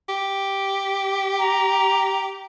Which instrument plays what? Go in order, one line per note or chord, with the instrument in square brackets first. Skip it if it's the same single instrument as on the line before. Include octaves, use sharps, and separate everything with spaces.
[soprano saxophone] G4
[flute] A#5